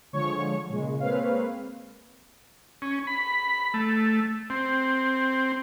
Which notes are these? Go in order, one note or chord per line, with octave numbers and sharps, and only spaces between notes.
D3 F3 G#3 C#5 C#6
A#2 C#3 G#3
G#3 A#3 C4 B4 C#5 F5
C#4
B5
A3
C4